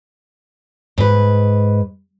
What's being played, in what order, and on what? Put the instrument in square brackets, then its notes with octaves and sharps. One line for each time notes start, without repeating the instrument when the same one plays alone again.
[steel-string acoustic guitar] G#2 B4